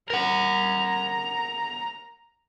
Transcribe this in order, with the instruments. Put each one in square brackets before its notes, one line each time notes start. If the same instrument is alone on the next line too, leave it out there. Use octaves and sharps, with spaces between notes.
[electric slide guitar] A#4 F#5 [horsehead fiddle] A#5